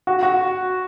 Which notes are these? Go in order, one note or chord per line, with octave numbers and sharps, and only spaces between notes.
F#4
F#4